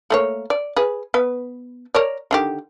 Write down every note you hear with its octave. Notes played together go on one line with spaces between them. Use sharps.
A3 A#3 C#5
D5
G#4 B4
B3 B4
A#4 C#5 D5
D3 D#3 G4